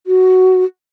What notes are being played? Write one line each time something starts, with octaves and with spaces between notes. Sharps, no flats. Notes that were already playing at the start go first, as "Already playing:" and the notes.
F#4